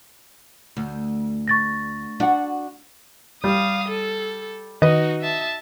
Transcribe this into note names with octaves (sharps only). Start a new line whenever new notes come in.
D2
C#6 A6 A#6
D4 F#4 F#5
G3 F5 D#6
A4
D#3 D#4 F#4 B4 D#5
E5 A5